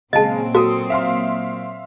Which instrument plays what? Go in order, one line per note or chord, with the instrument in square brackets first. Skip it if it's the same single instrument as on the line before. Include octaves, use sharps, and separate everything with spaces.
[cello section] A#2 F#3 C4 [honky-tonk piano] C#3 G#3 [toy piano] D#5 A5
[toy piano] F#4 [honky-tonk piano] A4 D#6
[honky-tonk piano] E5 F5 C6